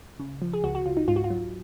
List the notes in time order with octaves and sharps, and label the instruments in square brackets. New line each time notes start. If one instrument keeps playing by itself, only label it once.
[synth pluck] C#3
F3
G#4
C#2 F#4
F#4
C#2 F4
D#4
G#2 F4
F#4
F4
F#3